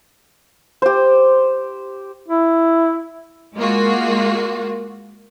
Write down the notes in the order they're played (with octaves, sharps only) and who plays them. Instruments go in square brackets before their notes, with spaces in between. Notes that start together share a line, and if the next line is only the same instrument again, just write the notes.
[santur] G4 C5
[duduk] E4
[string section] G#3 A#3 F4 F#4